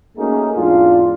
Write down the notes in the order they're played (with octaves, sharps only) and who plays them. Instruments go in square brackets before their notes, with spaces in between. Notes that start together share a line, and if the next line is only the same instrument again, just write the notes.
[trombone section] A3 A#3 C#4 D#4 F#4 G#4
E2 G#2 D4 F4